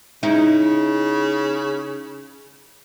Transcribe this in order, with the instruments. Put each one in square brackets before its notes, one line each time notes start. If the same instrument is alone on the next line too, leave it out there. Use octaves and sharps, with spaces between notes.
[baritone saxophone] C#3 [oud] D#4 E4